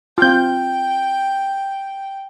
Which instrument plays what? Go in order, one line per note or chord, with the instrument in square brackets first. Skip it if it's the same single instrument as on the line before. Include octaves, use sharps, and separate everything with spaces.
[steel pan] C4 F4 [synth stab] F5 G6 [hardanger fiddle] G5